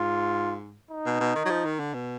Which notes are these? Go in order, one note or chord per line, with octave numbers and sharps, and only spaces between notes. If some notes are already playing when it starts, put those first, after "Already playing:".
Already playing: G#2 F4
D#4
B2
B2
D#3
F#3
F3
D#3
D3
B2